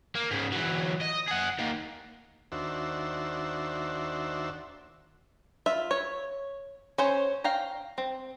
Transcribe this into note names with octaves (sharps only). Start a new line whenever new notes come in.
A#3
G#2 C#3
E3 F#3
D#5
G#4 F#5
D#3 A#3
D#2 D4 F#4 C5 E5
F4 E5
C#5
C#4 C5 C#5
F5 G5 A#5
C4